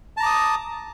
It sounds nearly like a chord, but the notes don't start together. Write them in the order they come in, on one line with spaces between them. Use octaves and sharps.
A5 A#5 D6 D#6